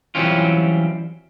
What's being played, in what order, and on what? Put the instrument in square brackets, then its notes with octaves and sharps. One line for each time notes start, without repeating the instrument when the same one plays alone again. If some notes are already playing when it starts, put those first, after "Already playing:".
[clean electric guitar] E3 F#3 G3 C4 C#4 F4